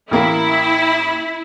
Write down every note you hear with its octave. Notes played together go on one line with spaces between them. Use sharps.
A1 A#3 E4